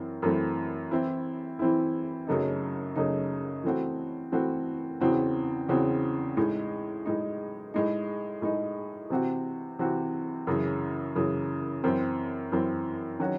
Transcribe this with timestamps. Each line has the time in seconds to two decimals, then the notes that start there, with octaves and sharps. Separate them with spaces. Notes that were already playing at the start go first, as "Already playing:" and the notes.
Already playing: F#2 E3 C4
0.22 F#2 E3 A3 C4
0.91 E3 C4 E4
1.59 E3 C4 E4
2.27 F#2 C#3 F#3 A3 D#4
2.96 F#2 C#3 F#3 A3 D#4
3.64 E3 A3 C4 F#4
4.32 E3 A3 C4 F#4
5.00 E2 C#3 E3 C4 F#4
5.69 E2 C#3 E3 C4 F#4
6.37 A2 G#3 D#4
7.05 A2 G#3 D#4
7.74 A2 G#3 D#4
8.42 A2 G#3 D#4
9.10 C3 E3 C4 F#4
9.79 C3 E3 C4 F#4
10.47 F#2 C#3 E3
11.15 F#2 C#3 E3
11.83 F#2 E3 C4
12.52 F#2 E3 C4
13.19 D#3 F#3 C#4 F#4